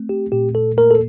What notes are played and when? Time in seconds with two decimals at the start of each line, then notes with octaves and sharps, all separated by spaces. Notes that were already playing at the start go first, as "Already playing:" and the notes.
Already playing: A3 C4
0.09 G4
0.32 A#2 G4
0.55 A4
0.77 A#3 A#4
0.91 A4